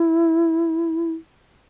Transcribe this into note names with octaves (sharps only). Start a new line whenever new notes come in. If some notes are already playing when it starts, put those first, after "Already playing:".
Already playing: E4